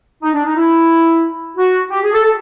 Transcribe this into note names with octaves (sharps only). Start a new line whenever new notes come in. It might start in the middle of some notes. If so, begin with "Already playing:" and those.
D#4
D4
D#4
E4
F#4
G4
G#4
A4
A4